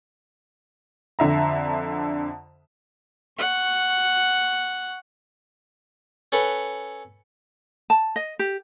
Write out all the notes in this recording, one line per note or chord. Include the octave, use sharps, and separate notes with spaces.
F2 D3 E5 A#5
F#5 C#6
C#4 A4 B4 F#5
A5
D#5
G4